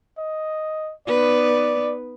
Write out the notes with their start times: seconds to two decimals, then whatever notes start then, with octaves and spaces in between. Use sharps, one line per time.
0.18 D#5
1.07 B3 D#4 B4 D5